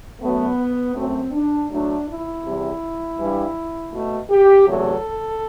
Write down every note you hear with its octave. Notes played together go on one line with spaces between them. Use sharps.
F#2 F#3 A3 B3
F#2 F#3 A3 C4
D4
A2 F#3 A3 D4
E4
E2 C3 G3
G2 E3 G3
B2 A3
G4
E2 C3 F#3 A3 A4